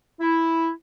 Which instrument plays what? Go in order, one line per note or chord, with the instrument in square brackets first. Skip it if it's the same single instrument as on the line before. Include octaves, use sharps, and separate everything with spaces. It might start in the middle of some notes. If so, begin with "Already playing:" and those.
[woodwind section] E4